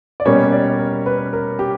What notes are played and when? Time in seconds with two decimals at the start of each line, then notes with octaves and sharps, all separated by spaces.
0.20 D5
0.25 B2 G3 A#3 C#4 C#5
0.52 D5
0.79 A#4
1.06 B4
1.33 A#4
1.59 G4